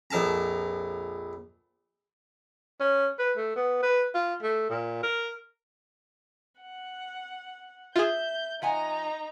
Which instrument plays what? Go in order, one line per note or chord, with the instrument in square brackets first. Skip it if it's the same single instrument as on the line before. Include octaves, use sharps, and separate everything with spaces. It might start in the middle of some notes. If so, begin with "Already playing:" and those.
[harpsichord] A#1 F2 A#4 A5 A#5
[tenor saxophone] C#4
B4
A3
B3
B4
F4
A3
A#2
A#4
[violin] F#5
[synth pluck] F4 G#4 [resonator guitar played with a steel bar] E5 [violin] G6
[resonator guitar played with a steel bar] F3 F#5 G#5 [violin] D#4 A#5